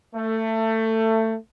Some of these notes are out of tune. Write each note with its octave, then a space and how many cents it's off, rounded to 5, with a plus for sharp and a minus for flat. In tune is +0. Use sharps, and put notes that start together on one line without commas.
A3 +20